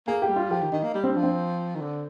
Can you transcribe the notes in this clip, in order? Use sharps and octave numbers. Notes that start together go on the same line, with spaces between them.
A#3 G#4
G4
G3
F4
F3 G4
D#3
D#3 D#4
A#3
G3
C4
D4
F3
C4
D#3
D3